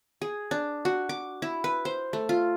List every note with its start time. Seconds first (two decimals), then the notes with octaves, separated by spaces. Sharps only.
0.22 G#4
0.51 D4
0.85 F#4
1.09 D6
1.42 E4
1.64 B4
1.85 C5
2.13 A3
2.29 F4